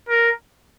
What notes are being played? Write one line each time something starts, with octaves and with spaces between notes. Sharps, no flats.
A#4